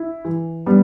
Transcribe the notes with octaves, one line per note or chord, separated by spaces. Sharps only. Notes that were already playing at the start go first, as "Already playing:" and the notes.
Already playing: E4
E3
G3 B3